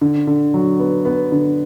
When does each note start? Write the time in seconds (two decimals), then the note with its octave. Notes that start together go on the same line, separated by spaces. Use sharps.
0.01 D3
0.27 D3
0.54 F#3
0.79 B3
1.05 B3
1.32 D3